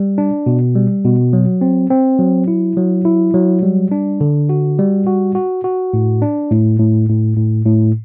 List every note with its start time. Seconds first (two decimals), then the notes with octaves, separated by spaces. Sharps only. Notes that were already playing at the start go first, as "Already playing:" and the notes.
Already playing: G3
0.18 D4
0.46 B2
0.75 G3
1.05 B2
1.33 F#3
1.61 C4
1.90 C4
2.19 F#3
2.48 E4
2.77 F#3
3.05 E4
3.34 F#3
3.63 G3
3.91 D4
4.21 D3
4.49 F#4
4.79 G3
5.07 F#4
5.35 F#4
5.64 F#4
5.93 A2
6.22 D4
6.51 A2
6.79 A2
7.09 A2
7.37 A2
7.65 A2